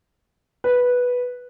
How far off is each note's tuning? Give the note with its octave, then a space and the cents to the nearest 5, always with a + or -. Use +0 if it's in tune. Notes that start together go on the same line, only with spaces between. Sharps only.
B4 -5